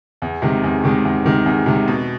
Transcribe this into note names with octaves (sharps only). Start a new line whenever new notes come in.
E2
C3 D#3 G#3
E2
C3 D#3 G#3
E2
C3 D#3 G#3
E2
C3 D#3 G#3
B2